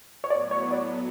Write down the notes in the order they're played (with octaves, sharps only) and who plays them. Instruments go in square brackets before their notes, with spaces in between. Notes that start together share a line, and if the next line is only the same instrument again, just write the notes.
[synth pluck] C#5
[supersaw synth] A2 F#3 B3 [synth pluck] D5
[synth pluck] C#5
D5